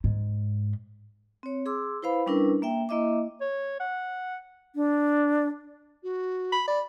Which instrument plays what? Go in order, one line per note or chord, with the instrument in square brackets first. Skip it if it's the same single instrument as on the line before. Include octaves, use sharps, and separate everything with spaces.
[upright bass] G#2
[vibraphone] C4 C#5
G#4 C6 D6 E6
E4 B4 C5 F5 B5
G3 C#4 D4 E4 A#4 B4
A#3 E5 G5
A#3 E4 D#5 E5 D6
[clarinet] C#5
F#5
[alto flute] D4
[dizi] F#4
[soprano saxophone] B5
[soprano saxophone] D5 [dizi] B5